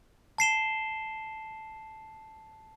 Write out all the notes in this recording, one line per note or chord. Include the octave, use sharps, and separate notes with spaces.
A5 C7 E7 G7